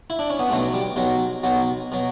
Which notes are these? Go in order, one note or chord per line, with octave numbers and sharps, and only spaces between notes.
E4
D4
C#4
B3
B1 B2 F#3 A3
G3
B1 B2 F#3
B1 B2 F#3
B2 F#3